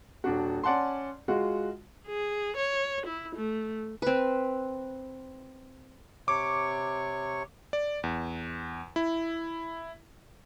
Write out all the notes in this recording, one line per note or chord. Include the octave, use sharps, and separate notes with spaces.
D#1 D4 F#4
C#4 D5 F#5 A5 C6
G#3 F4 F#4
G#4
C#5
E4
A3
C4 B4
C3 C#5 C#6 D6
D5
E2
E4